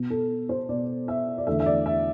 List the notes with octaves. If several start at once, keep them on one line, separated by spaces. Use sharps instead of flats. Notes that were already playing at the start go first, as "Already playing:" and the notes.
Already playing: B2 B3
A4
C5
B2 B3 D5
E5
D5
E2 D3 A3 E5
E5
D5
E5